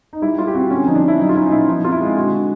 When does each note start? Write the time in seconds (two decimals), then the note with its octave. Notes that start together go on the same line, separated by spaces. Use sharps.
0.13 D#4
0.22 G3 E4
0.38 G3 F4
0.47 G4
0.55 C4 F#4
0.71 D3 C#4
0.87 F3 D#4
0.95 D4
1.04 C#4 E4
1.19 F#3 D#4
1.29 F4
1.36 C#4 E4
1.46 D#4
1.51 B2 E4
1.68 F3 D#4
1.84 C4 F4
1.92 E4
2.01 G#3
2.17 D3 F#4
2.32 D3